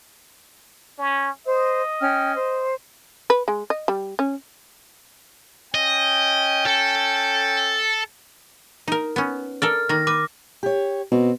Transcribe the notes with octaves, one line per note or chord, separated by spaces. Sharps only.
C#4
C5 D#5
C#4 G5 F6
C5
B4
G#3
D#5
G3
C#4
C#4 D#5 G5
A4
D#4 A#4
B3 C#4
A4 A#4 D5 F6
D#3 A#3 A6 A#6
B4 D6
G4 C#5
B2 C4